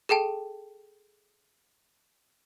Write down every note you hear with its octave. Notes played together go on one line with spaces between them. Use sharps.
G#4 A4 G5 A5